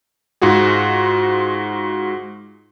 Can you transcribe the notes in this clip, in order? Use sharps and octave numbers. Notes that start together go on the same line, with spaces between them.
G#2 F4 F#4 G#4